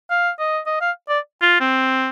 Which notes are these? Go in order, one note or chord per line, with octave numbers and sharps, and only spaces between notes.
F5
D#5
D#5
F5
D5
F4
C4